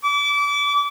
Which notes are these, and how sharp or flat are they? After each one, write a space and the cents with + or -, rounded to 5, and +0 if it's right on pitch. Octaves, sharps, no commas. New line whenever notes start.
D6 -30